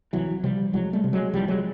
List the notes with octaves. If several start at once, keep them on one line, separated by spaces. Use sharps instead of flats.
C2 E3 F#3
C3 F3 G3
C2 F#3 G#3
G3 A3
C3
F#3 G#3
C2 F3 G3
F#3 G#3